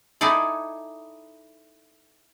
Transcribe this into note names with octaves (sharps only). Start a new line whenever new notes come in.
D#4 E4 G#4 A4 D5